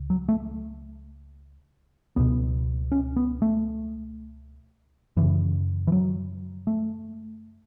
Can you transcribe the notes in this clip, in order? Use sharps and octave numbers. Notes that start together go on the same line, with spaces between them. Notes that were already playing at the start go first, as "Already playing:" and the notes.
Already playing: C#2
F#3
A3
C#2 B2 B3
C#4
B3
A3
F#2 C#3 E3
E3
F#3
A3